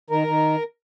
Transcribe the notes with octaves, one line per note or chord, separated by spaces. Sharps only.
D#3 A#4
D#3